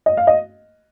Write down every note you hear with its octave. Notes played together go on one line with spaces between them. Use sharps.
D#5
F5
D#5